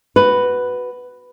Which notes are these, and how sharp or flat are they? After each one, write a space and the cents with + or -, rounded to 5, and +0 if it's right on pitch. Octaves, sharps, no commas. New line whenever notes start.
F#4 +0 B4 +5